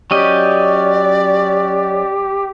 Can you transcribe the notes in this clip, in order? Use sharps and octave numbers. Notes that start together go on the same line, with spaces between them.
F#3 C#4 G4 D5 D#5